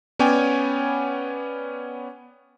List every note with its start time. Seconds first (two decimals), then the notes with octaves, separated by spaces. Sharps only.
0.19 B3 C#4 C#5 D5 G5 G#5